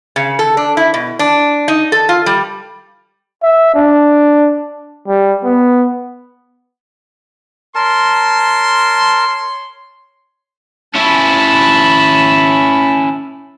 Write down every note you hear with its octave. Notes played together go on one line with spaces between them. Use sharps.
C#3
A4
D4
E4
B2
D4
D#4
A4
F4
G3
E5
D4
G3
B3
A#4 C#5 A5 C6
C#4 E4 A5 B5